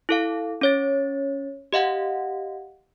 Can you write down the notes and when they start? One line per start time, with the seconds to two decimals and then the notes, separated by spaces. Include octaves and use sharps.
0.09 E4 A4 F5
0.61 C#4 C#5 A6
1.73 G4 D#5 F5 F#5